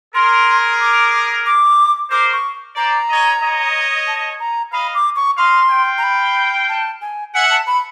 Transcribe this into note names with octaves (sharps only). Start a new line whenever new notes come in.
G#4 A#4 C6
D6
D6
A#4 C5 D6
C#6
C5 D5 A#5
C#5 D#5
C#5 D#5
A5
A#5
D#5 F5 B5
D6
C#6
D#5 F5 C6
F5 G5
A#5
B5
A5
G#5
E5 F#5 G#5
A5
B5